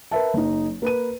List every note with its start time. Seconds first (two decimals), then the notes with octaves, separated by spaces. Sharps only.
0.11 A#4 B4 E5 A5
0.34 F#1 D#4
0.82 A#3 B4 D#7